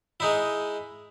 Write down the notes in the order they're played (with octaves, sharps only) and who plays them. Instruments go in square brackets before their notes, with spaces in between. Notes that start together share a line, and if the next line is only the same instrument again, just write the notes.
[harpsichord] G#3 D#4 E4